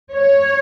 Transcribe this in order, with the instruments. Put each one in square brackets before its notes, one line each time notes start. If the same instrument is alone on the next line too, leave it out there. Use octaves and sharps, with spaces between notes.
[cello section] C#5